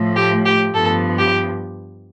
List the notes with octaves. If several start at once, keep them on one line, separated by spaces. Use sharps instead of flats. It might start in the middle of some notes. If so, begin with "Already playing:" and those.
Already playing: A2 F3 A3
G4
G4
G2 F3 B3 A4
G4